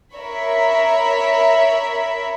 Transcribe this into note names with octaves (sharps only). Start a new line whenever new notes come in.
A#4 C#5 E5 B5